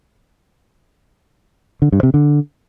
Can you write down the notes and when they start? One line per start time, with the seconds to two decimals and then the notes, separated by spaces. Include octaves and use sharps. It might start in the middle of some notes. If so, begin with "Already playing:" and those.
1.82 D3
1.92 G2
2.03 C3
2.14 D3